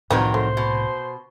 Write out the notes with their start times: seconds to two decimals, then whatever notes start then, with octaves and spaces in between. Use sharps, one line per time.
0.10 C2 F2 A2 C3 D#3 F#3 C4 B4
0.34 A3 C5
0.57 B2